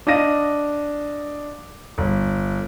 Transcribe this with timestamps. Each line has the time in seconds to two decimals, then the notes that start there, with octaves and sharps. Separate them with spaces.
0.07 D4 D#5 F5 A#6 D#7
1.98 G1